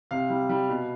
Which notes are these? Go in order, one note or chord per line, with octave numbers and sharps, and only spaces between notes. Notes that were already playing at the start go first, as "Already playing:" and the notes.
C3 F5
G3
G3
B2